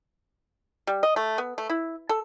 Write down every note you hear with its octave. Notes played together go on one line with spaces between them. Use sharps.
G3
D#5
A3
B3
A3
E4
A4